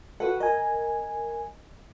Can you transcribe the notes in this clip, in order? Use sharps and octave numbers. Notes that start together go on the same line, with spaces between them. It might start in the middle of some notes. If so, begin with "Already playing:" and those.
F#4 A4 B4 F#5
A#4 D#5 G#5